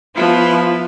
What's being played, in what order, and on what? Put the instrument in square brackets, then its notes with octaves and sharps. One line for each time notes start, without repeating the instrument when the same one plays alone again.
[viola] F3 [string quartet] B3 E4 B4